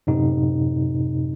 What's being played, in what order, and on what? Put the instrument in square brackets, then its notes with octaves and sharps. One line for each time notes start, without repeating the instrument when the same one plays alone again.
[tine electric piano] F#2 A2 C3 D#4